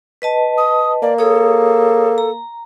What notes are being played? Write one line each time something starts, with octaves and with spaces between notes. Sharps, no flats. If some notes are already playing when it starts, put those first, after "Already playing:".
B4 D#5 A5
D#6
A#3 D5
G#4 A4 C#5 D#6
A#5